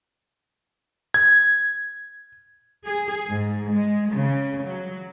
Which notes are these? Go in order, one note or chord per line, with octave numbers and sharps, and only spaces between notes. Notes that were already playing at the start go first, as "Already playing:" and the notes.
G#6
G#4
G#2
G#3
C#3
F#3